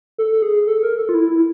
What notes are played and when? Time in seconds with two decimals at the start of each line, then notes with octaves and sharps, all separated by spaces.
0.18 A4
0.32 A4
0.42 G#4
0.67 A4
0.83 A#4
0.98 A4
1.09 F4
1.14 E4
1.30 E4